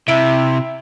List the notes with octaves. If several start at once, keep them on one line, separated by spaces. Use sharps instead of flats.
C3 E4 E5 D7